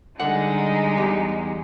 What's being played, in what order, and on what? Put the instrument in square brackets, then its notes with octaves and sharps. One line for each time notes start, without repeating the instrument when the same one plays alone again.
[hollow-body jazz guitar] D3 F#5 [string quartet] G3 G#3 D#4
[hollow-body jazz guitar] E2 G4